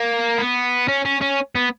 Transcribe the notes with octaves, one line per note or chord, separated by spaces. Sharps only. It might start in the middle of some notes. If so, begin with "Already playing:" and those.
Already playing: A#3
B3
C#4
C#4
C#4
B3